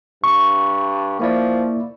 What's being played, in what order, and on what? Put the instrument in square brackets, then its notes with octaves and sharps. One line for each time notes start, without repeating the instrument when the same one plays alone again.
[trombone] G2 [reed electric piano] C#6
[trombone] F3 [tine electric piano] A#3 E4 D5